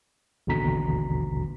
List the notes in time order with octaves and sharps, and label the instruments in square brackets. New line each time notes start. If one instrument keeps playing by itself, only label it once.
[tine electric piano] A1 D#2 B2 D3 A#5 B6